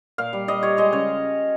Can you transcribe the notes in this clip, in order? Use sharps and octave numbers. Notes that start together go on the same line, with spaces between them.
A#2 F5
G3
G3 D#5
G3 C#5
G#3 D#5
C#3 C#5